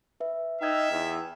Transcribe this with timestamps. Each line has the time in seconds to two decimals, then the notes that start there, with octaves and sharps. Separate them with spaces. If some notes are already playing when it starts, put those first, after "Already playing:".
0.20 B4 E5
0.62 D#4 E5 G5 F6 G#6
0.91 E2